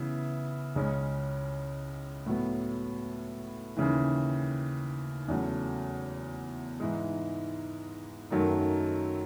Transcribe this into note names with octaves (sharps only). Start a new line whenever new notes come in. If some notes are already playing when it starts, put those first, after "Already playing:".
Already playing: C#3 E3 B3 E4
C#2 C#3 G#3 C#4
A2 F#3 B3
D#2 C#3 E3
E2 C#3 F#3 A3
G#2 E3 G#3 D#4
F#2 D#3 F#3 A3 D#4